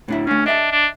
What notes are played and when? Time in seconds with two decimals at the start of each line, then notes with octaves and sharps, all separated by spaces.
0.08 A2 D4 E4
0.27 A3 C#4 D4
0.46 D4 D#5 E5 A5
0.72 D4